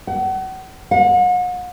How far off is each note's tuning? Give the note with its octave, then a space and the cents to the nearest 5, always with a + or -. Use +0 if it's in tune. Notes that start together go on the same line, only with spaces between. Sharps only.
F#5 +35
F#5 -40